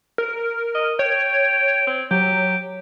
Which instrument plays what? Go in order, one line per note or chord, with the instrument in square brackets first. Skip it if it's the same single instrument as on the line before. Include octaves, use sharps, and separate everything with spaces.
[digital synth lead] A#4
[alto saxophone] D#5
[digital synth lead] C#5 [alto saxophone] G5
[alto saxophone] C4
[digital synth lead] F#3 [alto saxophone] G4